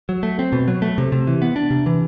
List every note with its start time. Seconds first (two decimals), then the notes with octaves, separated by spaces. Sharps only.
0.09 F#3
0.23 A3
0.39 C4
0.52 B2
0.68 F#3
0.82 A3
0.98 C3
1.12 C3
1.27 E3
1.42 B3
1.56 D4
1.71 C3
1.86 E3